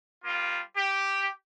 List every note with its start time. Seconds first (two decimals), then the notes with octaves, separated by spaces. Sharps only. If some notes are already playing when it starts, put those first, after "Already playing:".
0.23 G3 A#3 F4
0.76 G4